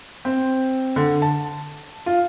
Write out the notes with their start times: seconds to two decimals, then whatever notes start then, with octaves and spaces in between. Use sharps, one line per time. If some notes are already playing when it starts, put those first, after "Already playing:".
0.25 C4
0.96 D3
1.22 A5
2.06 F4